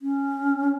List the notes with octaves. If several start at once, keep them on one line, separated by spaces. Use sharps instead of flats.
C#4